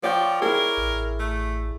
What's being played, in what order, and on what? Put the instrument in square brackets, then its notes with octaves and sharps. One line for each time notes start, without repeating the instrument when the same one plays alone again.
[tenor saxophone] F3 [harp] D5 G5 C#6
[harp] E4 G#4 [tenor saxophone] A#4
[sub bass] A1
[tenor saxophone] A3